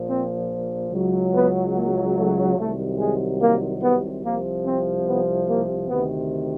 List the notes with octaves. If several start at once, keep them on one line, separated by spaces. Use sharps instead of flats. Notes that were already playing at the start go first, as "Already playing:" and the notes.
Already playing: A#1 A#2 F3
C4
C#2 C#3 F#3
B3
A#3
A3
C2 C3 D#3 F#3 A3
G#3
A#3
B3
C2 C3 F3 A#3
C4
B3
A#3
D2 C3 D#3 B3